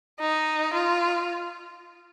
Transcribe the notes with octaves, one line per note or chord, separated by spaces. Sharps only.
D#4
F4